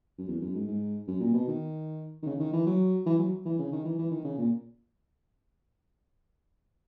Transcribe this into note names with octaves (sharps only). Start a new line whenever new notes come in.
F#2
E2
F#2
G#2
G#2
F#2
A#2
B2
D#3
D#3
C#3
D#3
E3
F#3
E3
F#3
E3
C#3
D#3
E3
E3
D#3
C#3
A#2